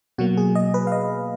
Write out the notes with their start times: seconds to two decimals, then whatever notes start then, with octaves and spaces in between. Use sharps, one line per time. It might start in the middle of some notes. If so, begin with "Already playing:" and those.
0.18 B2 F#3 A#3 F#4
0.37 G#4
0.55 D#5
0.74 B4
0.87 F5
0.92 D#5